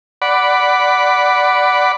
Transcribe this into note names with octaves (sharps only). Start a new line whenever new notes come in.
D5 F#5 B5